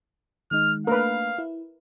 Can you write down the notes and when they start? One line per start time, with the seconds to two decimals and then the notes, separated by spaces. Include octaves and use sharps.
0.51 D#3 G#3 D#4 F6
0.87 A3 A#3 D4 A#4 B4 F5
1.38 E4